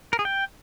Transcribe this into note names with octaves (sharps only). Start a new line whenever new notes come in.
A#4
G#4
G5